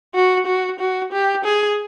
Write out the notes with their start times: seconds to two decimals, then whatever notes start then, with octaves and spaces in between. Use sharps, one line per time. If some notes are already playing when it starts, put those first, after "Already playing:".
0.15 F#4
0.46 F#4
0.79 F#4
1.12 G4
1.44 G#4